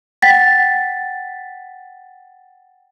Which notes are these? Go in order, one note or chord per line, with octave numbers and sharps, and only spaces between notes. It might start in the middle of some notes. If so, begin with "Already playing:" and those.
F#5 G5 A6 B6